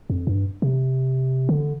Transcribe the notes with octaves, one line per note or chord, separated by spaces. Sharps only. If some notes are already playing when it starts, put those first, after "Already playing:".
F2
G2
C3
D3